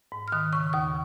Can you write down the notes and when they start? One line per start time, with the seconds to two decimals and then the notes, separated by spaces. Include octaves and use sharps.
0.12 G#2
0.28 F6
0.32 D#3 D#6
0.53 C#3 C#6
0.73 D#2 D#6